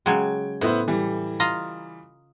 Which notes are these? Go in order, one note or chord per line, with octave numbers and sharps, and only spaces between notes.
C#3 F#3 G#3 G5 G#6
A2 B3 E4 C5
E3 G3
F4 D#5 A#5